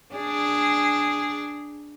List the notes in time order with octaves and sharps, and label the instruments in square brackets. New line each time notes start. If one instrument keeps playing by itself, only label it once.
[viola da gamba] D4 G#4